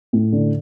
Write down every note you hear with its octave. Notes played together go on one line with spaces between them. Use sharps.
A2
D3